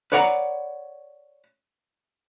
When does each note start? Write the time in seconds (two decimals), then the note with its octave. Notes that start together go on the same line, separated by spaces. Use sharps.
0.12 B4 C#5 D5 F#5 A#5